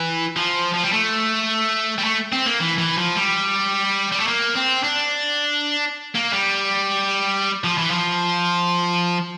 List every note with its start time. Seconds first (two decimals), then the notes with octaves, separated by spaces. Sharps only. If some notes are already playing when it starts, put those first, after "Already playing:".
Already playing: E3
0.36 F3
0.74 F3
0.83 G3
0.92 A3
1.98 G3
2.04 A3
2.32 C4
2.46 A#3
2.60 E3
2.78 E3
2.97 F3
3.16 G3
4.12 G3
4.20 A3
4.28 A#3
4.55 C4
4.84 D4
6.15 A#3
6.33 G3
7.64 F3
7.78 E3
7.91 F3